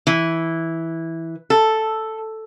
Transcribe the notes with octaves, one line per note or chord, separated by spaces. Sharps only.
E3
A4